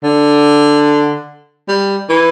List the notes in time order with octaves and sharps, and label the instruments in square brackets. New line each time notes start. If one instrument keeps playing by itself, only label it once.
[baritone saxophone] D3
G3
E3